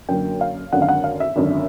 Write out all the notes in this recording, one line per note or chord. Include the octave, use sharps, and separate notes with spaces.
F#2 D3 F#3 A#3 G5
F5
G#1 F#2 D3 F#5
F5
F#5
F5
E5
G#1 F#2 D3